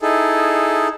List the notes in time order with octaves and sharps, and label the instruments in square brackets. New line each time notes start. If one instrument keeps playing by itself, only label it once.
[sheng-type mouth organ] D#4 E4 G#4 A4